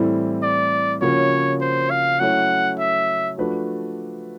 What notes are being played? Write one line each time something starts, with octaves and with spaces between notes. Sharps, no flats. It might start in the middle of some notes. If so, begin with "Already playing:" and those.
Already playing: A2 E3 G3 C4 E4
D5
C#3 F3 A#3 C#4 F#4 C#5
C5
F5
F#3 A3 C#4 E4 F#5
E5
F3 A3 D4 F#4 B4